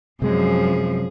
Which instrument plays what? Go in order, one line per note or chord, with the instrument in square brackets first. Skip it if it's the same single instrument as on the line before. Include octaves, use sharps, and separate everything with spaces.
[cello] F#2 F3 [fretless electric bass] C3 G#3 [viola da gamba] G#4